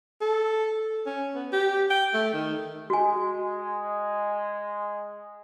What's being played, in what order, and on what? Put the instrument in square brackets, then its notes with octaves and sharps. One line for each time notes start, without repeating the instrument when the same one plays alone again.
[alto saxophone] A4
C#4
B3
G4
G5
A3
D#3
[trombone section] G#3 [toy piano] F#4 G#5